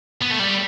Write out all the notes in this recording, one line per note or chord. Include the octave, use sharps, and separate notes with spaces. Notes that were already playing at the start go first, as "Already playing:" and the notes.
B3
A3
G3